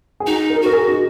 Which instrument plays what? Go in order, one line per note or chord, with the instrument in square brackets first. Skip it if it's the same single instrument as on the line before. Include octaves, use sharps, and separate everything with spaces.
[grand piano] G#4
[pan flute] D#4 [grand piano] F#4
[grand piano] A#4
[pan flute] F#4 [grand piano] A#4
[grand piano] G#4
D#4